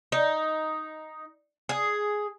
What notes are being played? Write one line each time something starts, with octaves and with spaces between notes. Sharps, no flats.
D#4
G#4